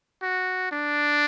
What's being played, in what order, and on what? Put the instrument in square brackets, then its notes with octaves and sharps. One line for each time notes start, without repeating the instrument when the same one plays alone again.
[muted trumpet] F#4
D4